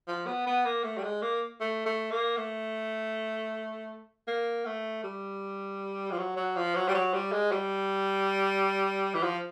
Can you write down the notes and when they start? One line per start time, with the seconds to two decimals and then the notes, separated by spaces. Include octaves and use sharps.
0.08 F3
0.27 B3
0.47 B3
0.65 A#3
0.84 A3
0.98 G3
1.04 G#3
1.22 A#3
1.61 A3
1.86 A3
2.11 A#3
2.37 A3
4.28 A#3
4.65 A3
5.04 G3
6.11 F3
6.18 F#3
6.36 F#3
6.56 F3
6.75 F#3
6.88 G3
6.94 F#3
7.13 G3
7.32 G#3
7.51 G3
9.14 E3
9.23 F3